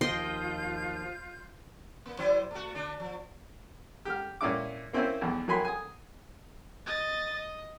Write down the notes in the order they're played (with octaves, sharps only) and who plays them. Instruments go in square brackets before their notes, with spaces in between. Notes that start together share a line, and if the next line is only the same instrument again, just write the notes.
[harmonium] D#2 F3 [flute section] F4 G6 [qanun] D#5 G5 C6
[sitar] A#3
F#3 E4 C5
A3 F#4
D3 D4
F3
[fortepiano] G4 F6
A#2 C#4 E4 D6
A#3 C4 C#4 E4 C5
B1 E2
F#3 A#3 G#5 B5 C6
G#5 D#6
[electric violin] D#5 A6
D#5